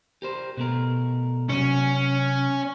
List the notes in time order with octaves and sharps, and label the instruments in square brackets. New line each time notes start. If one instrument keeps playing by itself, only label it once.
[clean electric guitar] G4 A#4 C5
B2 A3 A#4
[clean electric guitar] C3 F#3 [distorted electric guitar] C#4